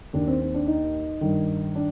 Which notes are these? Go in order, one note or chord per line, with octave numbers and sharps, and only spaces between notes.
D#2 D#3 D4
C4
C4
D4
D#4
G2 D#3
D4